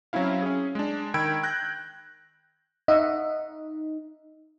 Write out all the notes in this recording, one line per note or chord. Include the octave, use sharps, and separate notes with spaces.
F#3 C4 C#4 E4 F5
C#4 G#4
G#3 D4
D#3 G5 B5 E6 G#6 D7
F#6 G6 A#6
D#4 D#5 E5 F#5